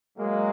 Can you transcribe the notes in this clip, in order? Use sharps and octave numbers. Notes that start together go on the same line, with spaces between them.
F#3 G#3 A#3